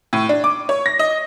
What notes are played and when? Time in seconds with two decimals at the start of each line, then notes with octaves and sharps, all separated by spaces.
0.13 A2
0.29 D4
0.44 D6
0.69 C#5
0.86 A#6
0.99 D#5